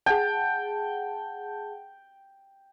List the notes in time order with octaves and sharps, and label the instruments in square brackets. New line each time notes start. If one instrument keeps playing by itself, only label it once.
[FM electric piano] G#4 F#5 A5 [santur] G5